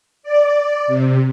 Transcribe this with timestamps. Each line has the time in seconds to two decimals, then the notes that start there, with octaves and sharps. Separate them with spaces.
0.23 D5
0.88 C3